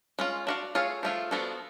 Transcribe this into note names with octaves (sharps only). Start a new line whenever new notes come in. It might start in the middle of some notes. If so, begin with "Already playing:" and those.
G#3 C#4 F4
D4 F#4 B4 D5 F5
A3 F4 G#4 C#5 F5
F3 A3 C#4 F4 G#4
F3 B3 D4 F#4 A4